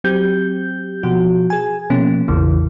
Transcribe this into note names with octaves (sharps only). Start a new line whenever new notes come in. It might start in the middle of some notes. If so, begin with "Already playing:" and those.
F#3 C4 G4 G6
B2 F3 F#4
G#4 G#5
B2 F3 A#3 C#4
A1 E2 C#3 E3